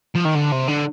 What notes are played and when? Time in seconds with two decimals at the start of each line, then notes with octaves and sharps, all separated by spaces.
0.15 F3
0.25 D#3
0.35 D3
0.52 C3
0.68 D3